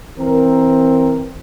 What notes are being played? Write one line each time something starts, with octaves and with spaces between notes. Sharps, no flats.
E3 C4 A#4